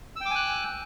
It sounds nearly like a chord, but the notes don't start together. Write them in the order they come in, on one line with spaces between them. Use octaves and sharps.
E6 G5 D6 G#5 F#6